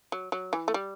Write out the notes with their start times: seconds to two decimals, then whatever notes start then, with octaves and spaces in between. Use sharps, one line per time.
0.12 F#3
0.32 F#3
0.53 E3
0.68 A3
0.74 G3